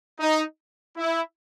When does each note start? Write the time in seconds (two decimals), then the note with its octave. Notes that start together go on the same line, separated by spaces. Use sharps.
0.20 D#4
0.97 E4